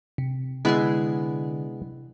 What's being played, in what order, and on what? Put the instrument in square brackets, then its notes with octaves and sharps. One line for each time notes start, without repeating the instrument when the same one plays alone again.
[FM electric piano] C3
[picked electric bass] D3 [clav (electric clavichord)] G#3 B3 [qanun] E4 G#4 C6